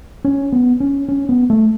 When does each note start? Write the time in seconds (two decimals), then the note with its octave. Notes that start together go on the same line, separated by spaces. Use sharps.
0.25 C#4
0.52 B3
0.80 C#4
1.09 C#4
1.29 B3
1.50 A3